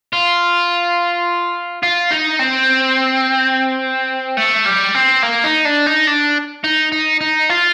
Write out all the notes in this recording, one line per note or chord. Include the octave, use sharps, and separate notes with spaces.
F4
F4
D#4
C4
A3
G3
C4
A#3
D#4
D4
D#4
D4
D#4
D#4
D#4
F4